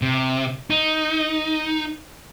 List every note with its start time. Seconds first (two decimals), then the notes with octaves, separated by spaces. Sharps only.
0.02 C3
0.70 D#4